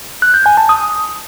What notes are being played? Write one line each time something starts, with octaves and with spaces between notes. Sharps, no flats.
F#6
G6
G#5
A5
D#6